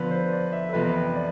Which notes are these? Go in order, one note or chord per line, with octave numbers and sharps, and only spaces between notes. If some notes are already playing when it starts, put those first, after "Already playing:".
Already playing: D3 F3 B3 B4
C5
D5
E5
A4
F2 C3 E3 B3 B4
D5